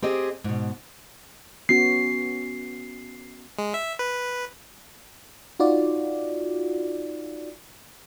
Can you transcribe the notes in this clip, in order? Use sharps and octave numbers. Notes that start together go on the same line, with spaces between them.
C4 G4 G#4 D#5
G#2 B2
B3 C#4 F#4 C7
G#3
E5
B4
D#4 F4 F#4 D5